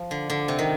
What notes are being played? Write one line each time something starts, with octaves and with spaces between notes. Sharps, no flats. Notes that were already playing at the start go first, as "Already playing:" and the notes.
Already playing: F3
D3
D3
C3
D#3